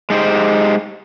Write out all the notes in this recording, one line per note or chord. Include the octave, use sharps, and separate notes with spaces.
G#3 D#4 G4 C5